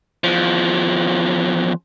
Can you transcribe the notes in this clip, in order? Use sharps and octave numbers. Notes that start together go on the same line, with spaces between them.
E2 F3